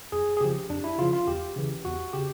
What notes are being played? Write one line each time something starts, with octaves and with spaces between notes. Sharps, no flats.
F2 G#4
G#4
C#3 F3 G4
F2 D4
E4
C#3 F3 F4
F4
E2 G4
C#3 E3
E2 F#4
C#3 G4